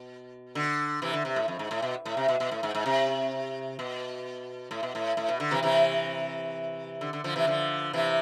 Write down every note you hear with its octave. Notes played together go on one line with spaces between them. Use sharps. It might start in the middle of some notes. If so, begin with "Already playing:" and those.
Already playing: B2
D3
C3 E3
D3
C3
A2
F2
G#2
A2
B2
A2
C3
B2
B2
A2
G#2
G#2
C3
B2
A2
B2
A2
A2
B2
D3
C3 E3
C3 E3
D3
D3
D3 F3
C3 E3
D3 F3
C3 E3